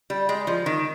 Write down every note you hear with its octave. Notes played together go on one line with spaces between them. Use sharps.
G3
G#3
F3
D#3